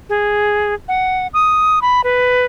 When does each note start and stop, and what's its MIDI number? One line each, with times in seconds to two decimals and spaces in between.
0.09 0.74 68
0.88 1.27 78
1.34 1.79 87
1.82 2.01 83
2.04 2.46 71